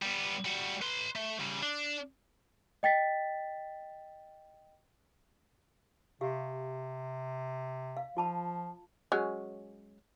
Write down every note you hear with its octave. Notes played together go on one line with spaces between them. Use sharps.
G3 B3
G3 F#4
B4 C6
A3
C#3 G3
D4
D#5 G5 A6 B6
C3 G4 F5
F5
F3 F4 A5 B5
F#3 G#3 C#4